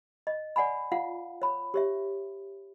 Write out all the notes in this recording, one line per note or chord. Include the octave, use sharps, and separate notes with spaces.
D#5
D5 F#5 G#5 B5
F4 F5 F#5
C#5 B5
G4 C#5 E5